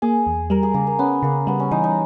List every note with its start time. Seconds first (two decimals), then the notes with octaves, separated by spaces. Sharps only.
0.02 A#3 G#4
0.27 E2
0.50 G3 A#4
0.63 G#4
0.74 C#3 A#3
0.87 A#3
0.99 B3 C#4
1.23 C#3 A#3
1.47 G3 B3
1.60 C#4
1.71 E3 D#4
1.84 D#4